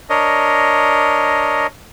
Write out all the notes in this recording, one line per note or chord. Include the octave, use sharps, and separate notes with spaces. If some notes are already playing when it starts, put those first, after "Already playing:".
D4 A#4 C#5 D#5